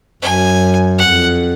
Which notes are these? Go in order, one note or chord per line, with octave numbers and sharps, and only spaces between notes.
F#2 G#5
F2 F#5